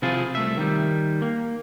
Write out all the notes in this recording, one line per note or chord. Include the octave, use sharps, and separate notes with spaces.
C3 F3 E4 F4 G#4
C2 A3 E5
D#3 G3
A#3